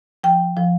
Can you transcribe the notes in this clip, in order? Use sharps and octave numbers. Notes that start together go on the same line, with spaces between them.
F3 G5
F3